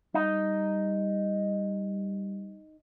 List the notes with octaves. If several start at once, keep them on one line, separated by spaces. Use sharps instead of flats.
G3 D#4